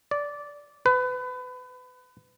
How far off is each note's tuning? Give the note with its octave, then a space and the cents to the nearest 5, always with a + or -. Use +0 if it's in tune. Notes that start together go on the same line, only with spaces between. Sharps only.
D5 -15
B4 +25